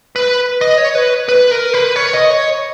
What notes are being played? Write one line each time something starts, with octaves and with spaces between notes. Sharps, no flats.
B4
D#5
C#5
B4
B4
A#4
B4
C#5
D#5
C#5